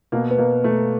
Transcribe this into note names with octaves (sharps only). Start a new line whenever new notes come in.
B2 A#3
B3
B2 A#3
B2 A3